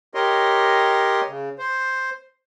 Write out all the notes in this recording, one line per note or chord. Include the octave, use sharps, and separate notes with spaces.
G4 A#4 C#5 D#5 C6
C#3
C5